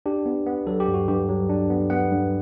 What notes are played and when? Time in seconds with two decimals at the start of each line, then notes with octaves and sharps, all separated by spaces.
0.06 D4 G4
0.26 B3
0.47 B3
0.67 F#3 A4
0.80 G4
0.88 G2
0.94 F#4
1.08 G2 G4
1.29 F#3
1.49 D4
1.70 B3
1.90 B3 F#5
2.11 G2